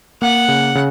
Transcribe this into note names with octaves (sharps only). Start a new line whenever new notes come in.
A#3 F#5
C#3
C#3